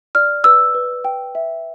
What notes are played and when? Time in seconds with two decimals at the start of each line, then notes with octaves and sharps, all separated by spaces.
0.15 D5 F6
0.44 B4 E6
0.74 B4
1.05 G5
1.35 E5